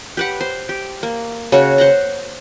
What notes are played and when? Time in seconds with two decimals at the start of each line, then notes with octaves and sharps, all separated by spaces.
0.17 G4 B4 F#5
0.41 C5
0.69 G4
1.03 A#3
1.52 C#3 F#4 C#5
1.78 C5 F#5 A#5